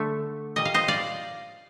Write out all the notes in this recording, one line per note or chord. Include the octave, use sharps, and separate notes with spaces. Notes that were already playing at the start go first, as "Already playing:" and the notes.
Already playing: D3 A3
A#2 G3 D#5
F5
C5 D#5
D5 F5